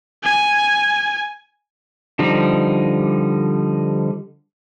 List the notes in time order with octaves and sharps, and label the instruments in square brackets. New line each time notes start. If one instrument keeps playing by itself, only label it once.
[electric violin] G#5
[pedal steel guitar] D3 F3 G3 D#4